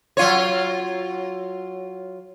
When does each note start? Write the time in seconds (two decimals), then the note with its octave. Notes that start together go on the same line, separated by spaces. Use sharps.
0.17 F#3 F4 C#5